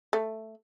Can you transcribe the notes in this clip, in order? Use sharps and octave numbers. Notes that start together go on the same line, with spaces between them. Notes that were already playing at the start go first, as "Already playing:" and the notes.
A3